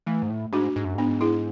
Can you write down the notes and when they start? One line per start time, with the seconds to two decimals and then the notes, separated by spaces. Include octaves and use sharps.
0.07 E3 A3
0.22 G#2
0.30 A2
0.53 G#2 D4 F#4
0.76 G#2
0.85 F#2
0.95 G#2 B3 D4
1.21 E4 G#4